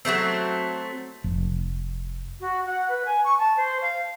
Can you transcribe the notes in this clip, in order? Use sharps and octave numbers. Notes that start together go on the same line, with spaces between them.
F#3 G3 A3 C4
F1
F#4
F#5
B4
G#5
C#6
A5
C5
F5